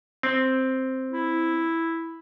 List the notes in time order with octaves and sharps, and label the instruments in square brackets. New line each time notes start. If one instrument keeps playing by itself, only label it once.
[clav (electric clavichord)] C4
[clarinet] E4